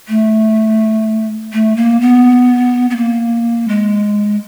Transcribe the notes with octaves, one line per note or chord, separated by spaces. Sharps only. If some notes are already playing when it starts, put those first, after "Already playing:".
A3
A3
A#3
B3
B3
A#3
G#3